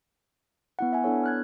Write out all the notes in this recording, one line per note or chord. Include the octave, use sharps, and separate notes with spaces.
B3 E4 F#5
E5 F#5 G#5
B3 D4 E4 A4 C#5
F6 F#6 G#6